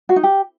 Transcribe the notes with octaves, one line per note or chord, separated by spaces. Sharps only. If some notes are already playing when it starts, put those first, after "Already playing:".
F#4
D#4
G4